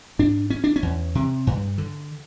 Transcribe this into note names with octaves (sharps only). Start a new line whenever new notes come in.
G#2 D4
C#4
D4
C#4
E2
C3
G2
D3